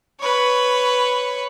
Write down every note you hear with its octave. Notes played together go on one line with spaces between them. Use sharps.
B4 C#5